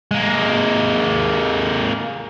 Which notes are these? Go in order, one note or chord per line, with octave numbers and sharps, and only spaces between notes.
G#3 A#3